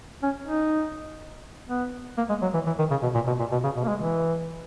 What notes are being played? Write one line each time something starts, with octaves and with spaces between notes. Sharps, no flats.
C#4
D#4
B3
A#3
G#3
F#3
E3
E3
D#3
C#3
B2
A#2
B2
A#2
B2
C#3
B2
A#3
G#3
E3